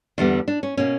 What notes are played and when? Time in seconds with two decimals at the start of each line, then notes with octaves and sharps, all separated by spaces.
0.18 E2 D3 G3 B3 D4
0.48 D4
0.63 C#4
0.77 B2 A#3 C#4